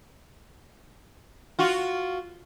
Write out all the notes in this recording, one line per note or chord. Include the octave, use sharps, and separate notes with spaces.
F4 F#4